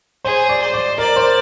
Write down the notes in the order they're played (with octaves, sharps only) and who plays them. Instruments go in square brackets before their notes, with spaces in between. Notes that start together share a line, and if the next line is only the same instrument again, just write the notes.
[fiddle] G#4 [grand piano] C5
[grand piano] D5
[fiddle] C5
[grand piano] D5
[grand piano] A#4 [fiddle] D5
[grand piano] C5